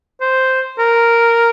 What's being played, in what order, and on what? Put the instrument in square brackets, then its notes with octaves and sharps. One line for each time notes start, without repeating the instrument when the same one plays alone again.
[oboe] C5
A#4